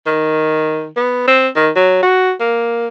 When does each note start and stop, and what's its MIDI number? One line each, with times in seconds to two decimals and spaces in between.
0.06 0.86 51
0.97 1.23 59
1.28 1.48 60
1.56 1.70 51
1.76 2.00 54
2.03 2.32 66
2.40 2.88 58